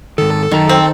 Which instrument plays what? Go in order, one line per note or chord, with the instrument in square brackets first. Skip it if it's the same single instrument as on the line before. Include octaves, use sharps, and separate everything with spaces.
[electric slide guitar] G#2 D#3 [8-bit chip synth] A4
[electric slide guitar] F#2 A#5 [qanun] D#3
[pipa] C4